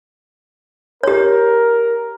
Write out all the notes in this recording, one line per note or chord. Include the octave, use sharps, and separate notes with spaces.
G4 A#4 C#5